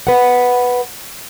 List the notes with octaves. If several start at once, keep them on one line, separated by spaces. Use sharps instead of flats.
B4 F#5